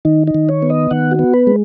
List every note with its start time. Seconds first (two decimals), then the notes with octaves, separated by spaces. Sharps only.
0.05 D#3 D#4
0.27 D#4
0.35 D#3
0.49 C#5
0.62 B3
0.70 D#5
0.91 D#3 F#5
1.11 F#4
1.19 B3
1.34 B4
1.47 G#3